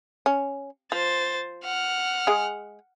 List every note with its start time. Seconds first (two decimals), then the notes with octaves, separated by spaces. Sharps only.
0.26 C#4
0.92 F3 C5 A6
1.64 F#5 F6
2.27 G#3 G#4